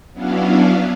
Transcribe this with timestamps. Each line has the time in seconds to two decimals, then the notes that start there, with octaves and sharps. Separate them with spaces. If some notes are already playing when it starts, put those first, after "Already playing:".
0.13 F#3 B3 C#4 D4 E4 F5